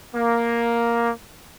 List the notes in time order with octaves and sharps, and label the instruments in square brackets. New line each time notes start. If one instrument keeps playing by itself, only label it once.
[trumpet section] A#3